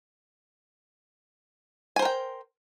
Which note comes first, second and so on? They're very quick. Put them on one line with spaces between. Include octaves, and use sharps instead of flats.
G#5 C5 A#4 G5